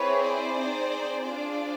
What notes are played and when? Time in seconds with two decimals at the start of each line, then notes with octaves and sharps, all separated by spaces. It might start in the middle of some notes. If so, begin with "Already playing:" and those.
Already playing: C4 E4 G#4 B4 C#5
0.24 C5 D5
0.58 C4 D#4 G#4
1.24 D4 F4 G#4 C5 D5